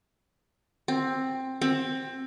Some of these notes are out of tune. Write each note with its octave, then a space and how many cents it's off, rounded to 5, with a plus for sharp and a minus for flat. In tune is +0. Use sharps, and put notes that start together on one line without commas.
C4 +10
C4 +15